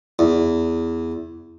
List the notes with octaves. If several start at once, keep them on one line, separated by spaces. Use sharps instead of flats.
E2